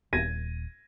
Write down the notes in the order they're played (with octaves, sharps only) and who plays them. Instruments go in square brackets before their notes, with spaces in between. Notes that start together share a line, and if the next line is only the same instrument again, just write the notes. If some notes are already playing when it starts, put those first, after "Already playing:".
[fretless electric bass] D#1 [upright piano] G#6 A#6 D#7